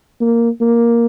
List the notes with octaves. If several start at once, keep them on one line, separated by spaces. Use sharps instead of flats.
A#3
A#3